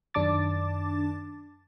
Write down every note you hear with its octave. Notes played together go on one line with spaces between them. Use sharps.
F#2 D#3 D4 A5 D6 A6